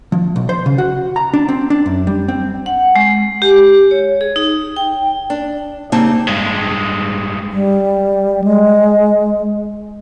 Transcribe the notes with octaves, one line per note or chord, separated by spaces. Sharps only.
F3
B1
C5
C#3
F#4
A#5
D4
C4
D4
F#2
G3
C4
F#5
G#3
G4
C#5
G#4
D#4
G5
D4
C#3 G3 A#3 C4 D#4 A5
G2 G#3
G3
G#3